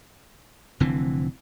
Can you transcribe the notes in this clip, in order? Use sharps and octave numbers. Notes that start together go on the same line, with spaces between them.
F1 D3 E3 C4